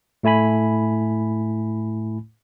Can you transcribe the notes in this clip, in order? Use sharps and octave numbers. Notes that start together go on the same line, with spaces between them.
A2 A3 E4 G#5 B5